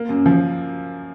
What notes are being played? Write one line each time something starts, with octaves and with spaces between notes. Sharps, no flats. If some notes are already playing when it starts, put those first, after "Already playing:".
Already playing: A#3
F#2
F3